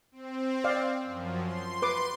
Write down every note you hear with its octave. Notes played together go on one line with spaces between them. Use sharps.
C4
D5 F5
F#2 F3
C6
B4 D6